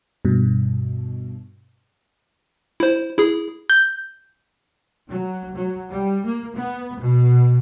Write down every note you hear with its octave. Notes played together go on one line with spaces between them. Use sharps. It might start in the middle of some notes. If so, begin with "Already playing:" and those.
G2 B2
E4 C5
E4 G#4
G6
F#3
F#3
G3
A#3
B3
B2